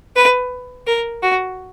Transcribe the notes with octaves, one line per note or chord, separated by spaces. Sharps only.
B4
A#4
F#4